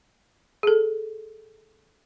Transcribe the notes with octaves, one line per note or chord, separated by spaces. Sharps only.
G#4 A4